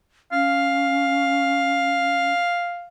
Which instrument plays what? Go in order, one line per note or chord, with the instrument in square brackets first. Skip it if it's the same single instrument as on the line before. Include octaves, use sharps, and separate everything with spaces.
[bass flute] C#4 [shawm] F5